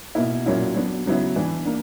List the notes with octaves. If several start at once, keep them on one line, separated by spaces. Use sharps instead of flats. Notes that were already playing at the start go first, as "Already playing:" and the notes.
B2 A#3 E4
A#2 F#3 C#4 E4
F#3 B3 D4
C#3 F#3 B3 E4
E3 B3 D4
A#3 D4